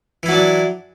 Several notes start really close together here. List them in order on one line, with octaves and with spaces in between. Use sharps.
E3 E4 F#3 D4